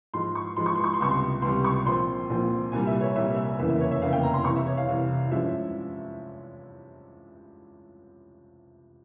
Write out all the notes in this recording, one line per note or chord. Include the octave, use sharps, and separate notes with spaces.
G#2 F3 G#3 C6
C#6
G#2 F3 G#3 C6
C#6
C6
C#6
C6
C#2 C3 G3 C#6
C6
C#2 C3 G3 C6
C#6
A#1 A#2 F3 C4 C6
A#1 A#2 F3 C4
C2 A#2 G3 G#5
E5
C#5
C2 A#2 G3 E5
E5
F1 E2 C#3 E3 A#3 E5
E5
C#5
E5
F1 E2 C#3 E3 A#3 F5
G5
A#5
C6
C2 C3 E3 C#6
E5
C#5
F5
C2 C3 E3
G2 F3 G#3 C#4 E4 E5